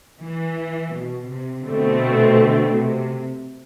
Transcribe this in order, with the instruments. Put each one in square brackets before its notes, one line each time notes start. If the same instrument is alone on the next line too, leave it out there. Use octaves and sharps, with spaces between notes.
[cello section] E3
B2
C3
[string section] B2 A3 C4 [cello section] D3
[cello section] D3
C3